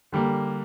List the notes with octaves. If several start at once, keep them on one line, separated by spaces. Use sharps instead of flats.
D3 G3 A#3